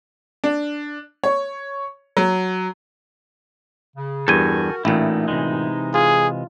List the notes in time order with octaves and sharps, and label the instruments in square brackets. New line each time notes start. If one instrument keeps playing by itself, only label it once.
[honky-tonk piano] D4
C#5
F#3
[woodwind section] C#3
[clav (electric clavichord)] E2 G2 [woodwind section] F#4 A#4 [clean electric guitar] A4 G5 G#5
[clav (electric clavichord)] A1 A#2 [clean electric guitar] E3 A3 E4 [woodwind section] D#4
[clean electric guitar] C3 E3 G#3
[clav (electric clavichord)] F4 [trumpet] G#4